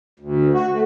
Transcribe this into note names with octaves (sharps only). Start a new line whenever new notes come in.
D2
F#4
A3